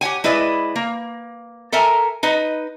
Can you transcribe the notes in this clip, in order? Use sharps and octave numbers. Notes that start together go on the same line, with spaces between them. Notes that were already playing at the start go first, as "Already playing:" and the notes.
G4 C#5 F#5 G#5
G#3 E4 B4 D5 D#5
A#3
A4 A#4 E5 G#5 A#5
D#4 B4 D#5